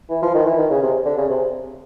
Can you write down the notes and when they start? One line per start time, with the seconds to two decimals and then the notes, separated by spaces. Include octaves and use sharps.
0.10 E3
0.22 F3
0.34 D#3
0.46 E3
0.58 D#3
0.70 C#3
0.82 C3
1.05 D3
1.18 C#3
1.30 C3